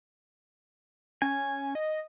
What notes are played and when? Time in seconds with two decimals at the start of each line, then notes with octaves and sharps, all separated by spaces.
1.22 C#4 G#5
1.75 D#5